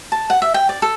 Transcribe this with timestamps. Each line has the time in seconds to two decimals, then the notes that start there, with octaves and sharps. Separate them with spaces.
0.12 A5
0.30 F#5
0.42 E5
0.54 G5
0.69 D5
0.82 A4